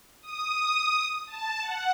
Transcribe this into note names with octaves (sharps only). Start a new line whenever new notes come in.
D#6
A5
F#5